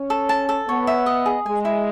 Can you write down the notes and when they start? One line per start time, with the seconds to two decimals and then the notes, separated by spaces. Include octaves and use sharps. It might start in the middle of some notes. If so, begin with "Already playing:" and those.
Already playing: C#4
0.10 A4
0.29 A5
0.49 A4
0.67 B3 C#5
0.87 E5
1.06 D#5
1.26 G#4
1.46 G#3 G#5
1.65 E4